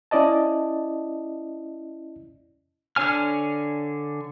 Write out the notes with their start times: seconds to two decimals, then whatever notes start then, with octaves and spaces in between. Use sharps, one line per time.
0.11 C#4 E4 D5 D#5 A5
2.96 D3 D4 C#5 G#5 F6